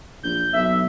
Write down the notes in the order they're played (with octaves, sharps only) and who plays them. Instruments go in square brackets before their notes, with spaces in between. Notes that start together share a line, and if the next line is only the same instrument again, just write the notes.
[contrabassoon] A#1 [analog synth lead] G6
[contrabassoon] B1 [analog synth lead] E5